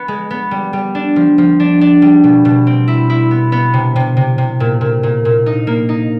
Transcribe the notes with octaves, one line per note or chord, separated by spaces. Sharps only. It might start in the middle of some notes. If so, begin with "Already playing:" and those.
Already playing: B3
G#3
B3
G3
G3
D4
F3
F3
D4
D4
G3
B2
B2
C4
E4
E4
B3
B3
C3
C3
C3
C3
A#2
A#2
A#2
A#2
D#4
A#3
D#4